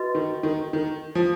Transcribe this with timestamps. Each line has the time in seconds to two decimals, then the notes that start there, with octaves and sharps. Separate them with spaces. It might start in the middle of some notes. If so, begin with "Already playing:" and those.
Already playing: F#4 B4 D#5
0.15 D#3
0.43 D#3
0.73 D#3
1.15 F3